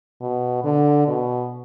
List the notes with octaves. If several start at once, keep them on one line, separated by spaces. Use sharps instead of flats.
B2
D3
B2